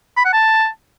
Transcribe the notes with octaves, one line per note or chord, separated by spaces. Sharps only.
B5
F#5
A5